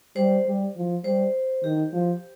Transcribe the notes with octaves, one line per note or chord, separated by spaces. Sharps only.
G3 C5
G3
F3
G3 C5
D#3 G4
F3